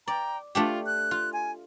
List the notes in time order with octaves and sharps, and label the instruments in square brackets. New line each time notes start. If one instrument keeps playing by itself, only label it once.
[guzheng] D5 [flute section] G5 A#5
[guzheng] A3 D4 G4 [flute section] F4
[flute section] F#6
[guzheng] F4
[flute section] G#5